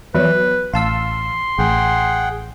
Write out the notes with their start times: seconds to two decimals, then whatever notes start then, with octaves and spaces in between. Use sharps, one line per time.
0.15 E2 F#3 B4
0.74 A1 F5 A5 C6 E6
1.59 A1 G#4 F#5 G5